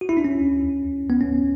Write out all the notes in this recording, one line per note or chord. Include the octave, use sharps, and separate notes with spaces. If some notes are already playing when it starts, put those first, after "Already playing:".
F#4
E4
D4
C#4
B3
C#4